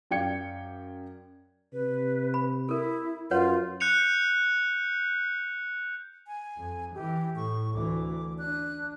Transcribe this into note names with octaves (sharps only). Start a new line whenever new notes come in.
F#2 D5 F5 G5 G#6 C#7
C3 B4
B5
E4 A4 A#4
F#2 F4 B4 C#5 F#5
F#6 G6 C#7 F7
G#5
F2
E3 G4
A2 C#6
D2 E3 D6
D4 F#6